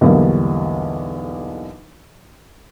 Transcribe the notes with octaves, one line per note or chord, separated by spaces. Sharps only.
B1 E2 D3 G3 A#3